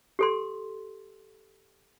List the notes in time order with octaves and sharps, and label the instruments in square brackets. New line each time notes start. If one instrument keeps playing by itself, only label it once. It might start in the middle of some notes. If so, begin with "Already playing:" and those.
[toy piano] G4 A4 C6